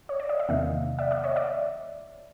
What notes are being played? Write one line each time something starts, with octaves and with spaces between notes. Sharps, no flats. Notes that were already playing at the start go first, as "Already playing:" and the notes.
C#5
D5
D#5
E5
E2 C3 D#3 F#3 A#3 D#5 F5
D5 E5
D5 E5
C#5 D#5
D5 E5